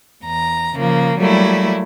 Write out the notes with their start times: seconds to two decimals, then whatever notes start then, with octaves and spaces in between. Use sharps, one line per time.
0.23 E2 A#5
0.75 C#3 F3 A#3
1.19 F#3 G3 A3 A#3 E4